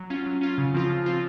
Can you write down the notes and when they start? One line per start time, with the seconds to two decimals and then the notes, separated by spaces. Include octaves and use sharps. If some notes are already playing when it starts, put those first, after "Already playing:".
Already playing: F#3
0.10 C#4 F4
0.26 F#3
0.41 C#4 F4
0.58 C#3
0.74 F3 C4 F4
0.90 C#3
1.06 F3 C4 F4